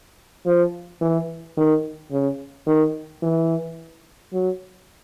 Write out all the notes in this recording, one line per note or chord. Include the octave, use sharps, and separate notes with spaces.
F3
E3
D#3
C#3
D#3
E3
F#3